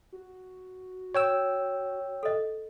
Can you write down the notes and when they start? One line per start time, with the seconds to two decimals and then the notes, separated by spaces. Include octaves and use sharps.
0.13 F#4
1.15 C#5 G5 E6
2.23 A4 D#5